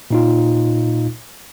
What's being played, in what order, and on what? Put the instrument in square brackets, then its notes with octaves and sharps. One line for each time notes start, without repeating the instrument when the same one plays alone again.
[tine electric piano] A#2 D#4 F4